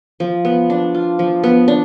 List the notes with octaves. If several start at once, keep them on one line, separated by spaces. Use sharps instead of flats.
F3
B3
D4
F4
F3
B3
D4